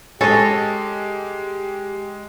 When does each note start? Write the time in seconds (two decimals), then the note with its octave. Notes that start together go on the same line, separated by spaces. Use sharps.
0.21 G#3 C#4 G4 A4 C#5 D#5